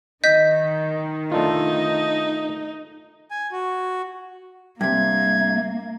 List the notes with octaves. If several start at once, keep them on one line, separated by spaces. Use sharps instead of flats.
D#3 D#5 G6 B6
A3 D4 D#4 F4
G#5
F#4
G2 C3 A#3 E5 G#6